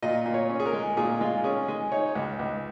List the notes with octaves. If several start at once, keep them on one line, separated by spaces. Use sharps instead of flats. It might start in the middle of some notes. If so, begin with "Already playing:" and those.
A#2 D#5
A#2
C#5
C#4
G#4
A#4
G#3
A#2 G#4
G#3 F4
C#4 G#4
G#3 G#4
D#4 C#5
C#2
C#2